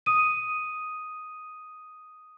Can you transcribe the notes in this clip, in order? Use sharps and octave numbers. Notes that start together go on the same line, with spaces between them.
D#6 D#7